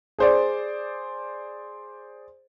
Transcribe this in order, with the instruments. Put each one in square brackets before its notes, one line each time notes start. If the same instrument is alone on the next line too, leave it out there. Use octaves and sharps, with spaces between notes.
[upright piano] G#4 C5 D5